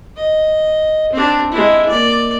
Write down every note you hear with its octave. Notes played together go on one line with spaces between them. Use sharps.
D#5
C4 D4
G#3 E4
A#3 D5